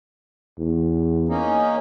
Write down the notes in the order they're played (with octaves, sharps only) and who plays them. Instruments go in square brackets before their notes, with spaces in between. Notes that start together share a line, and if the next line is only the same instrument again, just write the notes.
[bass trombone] E2
[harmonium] A#3 C#4 D#4